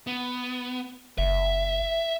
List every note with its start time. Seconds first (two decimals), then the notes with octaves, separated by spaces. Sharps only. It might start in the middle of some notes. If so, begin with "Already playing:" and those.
0.07 B3
1.18 F#1 E5